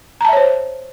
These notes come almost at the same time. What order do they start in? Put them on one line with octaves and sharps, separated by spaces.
A#5 A5 E5 C#5 C5